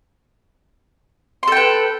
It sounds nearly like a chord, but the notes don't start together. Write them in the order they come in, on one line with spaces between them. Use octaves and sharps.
C6 A4 G5 B4